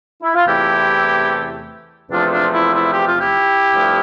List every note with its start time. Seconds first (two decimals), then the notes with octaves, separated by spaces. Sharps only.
0.23 E4
0.35 F4
0.47 E2 C3 E3 A3 E4 G4
2.11 E2 C3 F3 A3 D4 F4
2.31 D4 F4
2.53 E4
2.73 E4
2.93 G4
3.07 F4
3.19 E4 G4
3.75 G2 F3 A3